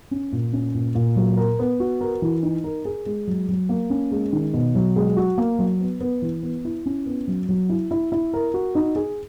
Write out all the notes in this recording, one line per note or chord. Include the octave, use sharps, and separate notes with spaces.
C#4
A#2
C#4
A#2
A#2
F#3
A#4
B3
F#4
A#4
E3
D#4
A#4
G#4
G#3
F#3
F#3
A#3
C#4
G#3
D#3
B2
F#3
G#3
F#4
A#3
F#3
B3
B3
E3
B3
E4
C#4
B3
F#3
F#3
E4
E4
E4
A#4
F#4
D#4
G#4